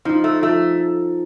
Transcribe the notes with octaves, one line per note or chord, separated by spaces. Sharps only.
F3 D#4
A3
F3 A3